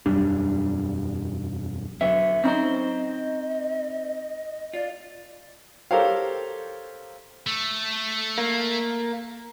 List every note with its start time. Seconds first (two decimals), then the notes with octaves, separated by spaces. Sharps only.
0.06 E1 F#2 G3 D4
2.01 D3 F#3 B3 E5
2.44 C4 C#4 D#4 C5 D#5
4.73 F4 D5
5.91 G4 A4 A#4 C5 C#5 F5
7.47 A3
8.38 A#3